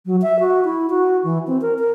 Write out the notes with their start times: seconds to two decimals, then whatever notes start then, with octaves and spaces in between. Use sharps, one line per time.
0.06 F#3
0.22 E5
0.40 F#4
0.65 E4
0.90 F#4
1.24 E3
1.47 C4
1.62 A#4
1.79 A#4